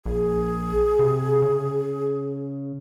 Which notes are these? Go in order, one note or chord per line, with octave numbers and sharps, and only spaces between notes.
A#1 G#4
C3
C#3